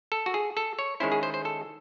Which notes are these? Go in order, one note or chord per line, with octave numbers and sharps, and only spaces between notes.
A4
F#4
G#4
A4
C#5
D#3 G#3 C#4 E4 C5
G#4
C5
C5
A4